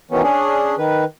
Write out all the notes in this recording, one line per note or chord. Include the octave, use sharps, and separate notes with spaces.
D#3 E3 F#3 B3 C#4
C#4 D4 G#4
D#3 B4